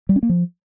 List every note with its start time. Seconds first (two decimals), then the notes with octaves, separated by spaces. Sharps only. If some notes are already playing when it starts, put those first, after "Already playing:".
0.09 G3
0.16 C#4
0.23 A#3
0.29 F3